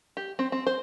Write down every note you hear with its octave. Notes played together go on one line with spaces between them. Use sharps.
G4
C4
C4
C5